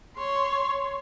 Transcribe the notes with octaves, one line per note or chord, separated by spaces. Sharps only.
C#5 C6